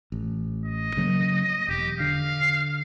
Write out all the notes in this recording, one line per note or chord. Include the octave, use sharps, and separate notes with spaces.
A1
D#5
C#3 F#3 A#3
E1 G4
D3 F5